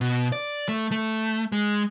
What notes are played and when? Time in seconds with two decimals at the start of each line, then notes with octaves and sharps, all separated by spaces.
0.01 B2
0.32 D5
0.68 A3
0.91 A3
1.52 G#3